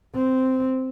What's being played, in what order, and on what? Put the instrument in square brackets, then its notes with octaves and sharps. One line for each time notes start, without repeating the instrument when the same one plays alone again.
[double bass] C4